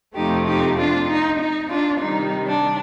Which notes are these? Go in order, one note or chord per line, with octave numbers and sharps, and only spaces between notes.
F2 C3 F3 A3 D#4 G4
D#4 G4
D4 F4
D#4
D#4
D4 F4
C3 D#3 G3 D#4
D4